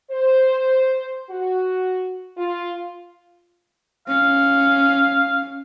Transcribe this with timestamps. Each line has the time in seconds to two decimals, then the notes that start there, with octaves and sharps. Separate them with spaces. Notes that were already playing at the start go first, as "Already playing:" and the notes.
0.11 C5
1.30 F#4
2.37 F4
4.08 C#4 F5